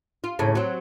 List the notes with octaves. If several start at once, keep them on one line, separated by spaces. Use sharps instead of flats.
F4
D#2 A2 C#3
F#3 C4